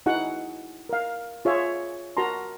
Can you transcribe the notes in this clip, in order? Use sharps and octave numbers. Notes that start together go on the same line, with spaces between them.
D#4 E4 F#4 G#4 F#5
A#4 F5
F4 G#4 C#5 E5
F#4 A#4 A5 A#5 C6